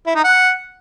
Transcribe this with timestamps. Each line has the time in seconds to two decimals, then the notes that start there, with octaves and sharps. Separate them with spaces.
0.07 E4
0.16 D#4
0.24 F#5